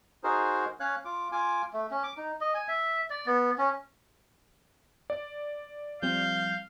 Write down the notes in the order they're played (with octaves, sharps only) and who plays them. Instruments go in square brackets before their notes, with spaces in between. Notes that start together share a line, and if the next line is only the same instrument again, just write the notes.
[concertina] D#4 F#4 G#4 A#4 C5
C#4 C#5 F5 F#6
F4 D6
F4 G#5 D6
[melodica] A3
C#4
D6
D#4
D#5
G#5
E5
D5
B3
C#4
[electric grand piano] D5
[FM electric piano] F3 G3 C4 [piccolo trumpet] F5 [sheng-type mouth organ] G6